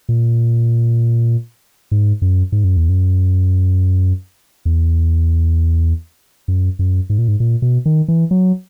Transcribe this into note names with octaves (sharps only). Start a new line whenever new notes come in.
A#2
G#2
F#2
G#2
F#2
E2
F#2
E2
F#2
F#2
G#2
A#2
G#2
A#2
B2
D#3
E3
F#3